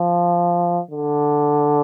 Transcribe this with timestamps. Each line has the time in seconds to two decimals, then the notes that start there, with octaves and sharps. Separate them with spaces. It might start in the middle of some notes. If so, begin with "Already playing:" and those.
Already playing: F3
0.91 D3